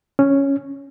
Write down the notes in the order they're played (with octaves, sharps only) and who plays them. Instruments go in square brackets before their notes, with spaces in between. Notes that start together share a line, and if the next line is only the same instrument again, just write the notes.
[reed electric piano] C#4